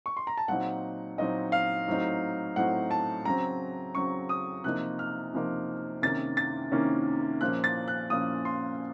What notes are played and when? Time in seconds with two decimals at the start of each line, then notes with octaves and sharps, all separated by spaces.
0.06 C#6
0.17 C6
0.27 A#5
0.37 A5
0.48 A#2 F#3 C4 D#4 F#5
1.18 A#2 F#3 C4 D#4 D#5
1.52 F5
1.87 A2 F#3 C4 D#4
2.56 A2 F#3 C4 D#4 F#5
2.91 A5
3.25 C#3 F#3 C4 A#5
3.95 C#3 F#3 C4 C#6
4.29 D#6
4.64 C3 F3 A#3 D#4 F#6
4.99 F6
5.33 C3 F3 A#3 D#4
6.02 C3 D#3 A#3 C#4 A6
6.37 A6
6.72 C3 D#3 A#3 C#4
7.41 A#2 F3 A#3 C#4 F#6
7.64 A6
7.88 F#6
8.10 A#2 F3 A#3 C#4 D#6
8.45 C6